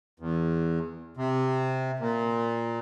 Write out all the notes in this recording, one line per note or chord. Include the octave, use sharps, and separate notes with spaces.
E2
C3
A#2